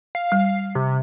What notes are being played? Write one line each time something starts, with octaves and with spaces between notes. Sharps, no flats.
F5
G3
C3